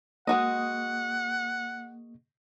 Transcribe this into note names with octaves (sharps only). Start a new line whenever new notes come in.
G#3 A#3 F#4 D#5 F#5 D#6